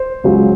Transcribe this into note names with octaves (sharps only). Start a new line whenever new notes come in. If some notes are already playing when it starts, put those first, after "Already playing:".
Already playing: C5
C#2 C#3 F#3